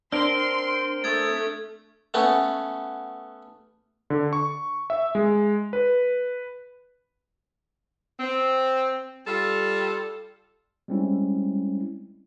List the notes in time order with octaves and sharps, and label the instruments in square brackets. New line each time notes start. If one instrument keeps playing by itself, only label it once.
[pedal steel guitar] C4 A#4 [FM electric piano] D4 [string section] C6 [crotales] F6
[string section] A3 [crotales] D#6 G#6 A6
[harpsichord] A3 B3 C#4
[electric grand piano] D3
C#6
E5
G#3
B4
[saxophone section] C4
G3 F4 A4
[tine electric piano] G3 G#3 C4 C#4 E4